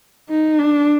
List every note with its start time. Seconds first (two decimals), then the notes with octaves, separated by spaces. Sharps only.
0.30 D#4
0.59 D4